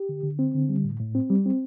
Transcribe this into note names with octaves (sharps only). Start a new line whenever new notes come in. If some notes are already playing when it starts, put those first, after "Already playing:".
Already playing: G4
D3
D3
C4
D3
G3
A2
A2
C4
G3
C4